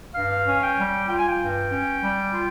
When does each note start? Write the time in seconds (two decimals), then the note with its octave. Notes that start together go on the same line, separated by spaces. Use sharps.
0.15 G2 F5
0.47 C#4
0.62 G5
0.78 G3
1.09 F4 G5
1.18 G#5
1.28 G5
1.40 G2
1.71 C#4
2.02 G3
2.33 F4